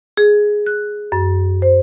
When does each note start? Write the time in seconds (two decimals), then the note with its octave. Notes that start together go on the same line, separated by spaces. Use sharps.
0.17 G#4
0.66 F#6
1.12 F#2
1.62 C5